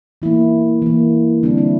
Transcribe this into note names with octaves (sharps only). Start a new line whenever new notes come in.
E3 A#3 E4
E3 A#3
D3 G3 C4 D4
E4